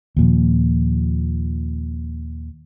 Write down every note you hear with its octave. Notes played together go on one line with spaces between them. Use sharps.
D#2 A#2 F3